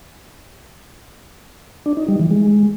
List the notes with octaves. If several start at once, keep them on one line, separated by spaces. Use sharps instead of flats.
D4
D#4
G3
E3
G#3